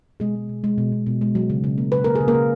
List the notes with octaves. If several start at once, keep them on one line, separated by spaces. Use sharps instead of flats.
B2 G#3 G#4
G#3
B2
G#3
B2
B2
B2
G#3
F#3
C#3
C#3
A#3
C#3 B4
A#3 A#4
G#4
C#3
A#3 A#4
C#3